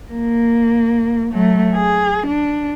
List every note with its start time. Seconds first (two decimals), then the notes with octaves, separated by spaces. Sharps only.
0.11 A#3
1.32 F#3 A3
1.75 G#4
2.27 D4